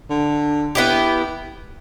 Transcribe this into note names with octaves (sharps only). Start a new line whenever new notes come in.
D3
B3 E4 G4